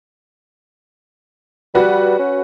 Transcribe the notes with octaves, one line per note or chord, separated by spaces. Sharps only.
G3 F#4 B4
C#4